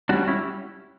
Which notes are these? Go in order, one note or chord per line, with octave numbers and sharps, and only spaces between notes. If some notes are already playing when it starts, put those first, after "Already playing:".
G3 C#4 D4 F#4
C#4 E4